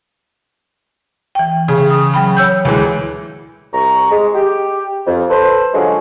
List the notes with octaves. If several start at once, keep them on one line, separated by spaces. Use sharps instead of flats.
E3 G5
C#3
D#6
F#3 G5 B5
C#5 E6 G6
D2 E3 G#3
C2 A#5 C#6
G#3
G4
F2
A4 B4 C5
D3 F3 F#3 G#3 C#4